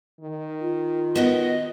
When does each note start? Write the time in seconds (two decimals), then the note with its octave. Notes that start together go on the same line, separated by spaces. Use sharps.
0.21 D#3
0.61 F4
1.16 B3 F#4 A#4 D#5